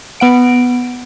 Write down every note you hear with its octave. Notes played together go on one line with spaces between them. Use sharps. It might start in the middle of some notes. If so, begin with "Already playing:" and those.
B3 F#5 D7